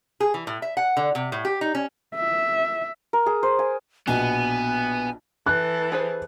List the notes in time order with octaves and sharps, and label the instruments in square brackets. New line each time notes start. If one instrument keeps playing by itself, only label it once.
[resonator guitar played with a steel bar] G#4
E3
A2
E5
F#5
D3
C3
A2
G4
D#4
C#4
[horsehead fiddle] E5
[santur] A#4
G#4
C5
G#5
[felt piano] A#1 B2 [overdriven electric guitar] B3 [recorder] G#5
[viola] E3 A4 [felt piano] F#6
[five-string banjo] G#4 B4 C5